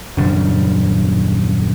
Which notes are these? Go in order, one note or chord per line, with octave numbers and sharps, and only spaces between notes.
D#1 F#2 C#3 D4